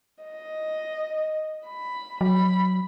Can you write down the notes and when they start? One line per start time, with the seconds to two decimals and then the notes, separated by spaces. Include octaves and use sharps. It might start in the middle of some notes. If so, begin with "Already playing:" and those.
0.23 D#5
1.67 B5
2.21 F#3 B5